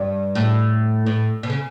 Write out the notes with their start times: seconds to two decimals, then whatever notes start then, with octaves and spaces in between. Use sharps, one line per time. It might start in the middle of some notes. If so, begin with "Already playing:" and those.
Already playing: G2
0.35 A2
1.07 A2
1.43 B2
1.50 C#3